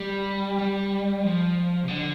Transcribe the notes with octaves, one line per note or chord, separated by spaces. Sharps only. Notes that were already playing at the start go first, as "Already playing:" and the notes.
Already playing: G3
G3
F3
C3
D3